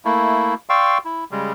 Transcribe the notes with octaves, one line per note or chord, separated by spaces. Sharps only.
A3 A#3 E4
D5 F5 G5 C6 C#6 E6
E4
C#3 G3 G#3